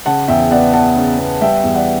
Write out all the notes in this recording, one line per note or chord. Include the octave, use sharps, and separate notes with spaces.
C#3 F#5 A5
E2 E5 G5
B3 D5 F#5
B3 F#5 A5
C#3
B3
G3 E5 G5
E2
D5 F#5